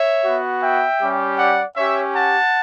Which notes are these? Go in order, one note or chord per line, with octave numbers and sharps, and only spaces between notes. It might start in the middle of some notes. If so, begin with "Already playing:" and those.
Already playing: C#5 E5
B3 F#4
E5 G5
G3 C#4 G4
D5 F#5
C#4 G4 C#5 E5
F#5 A5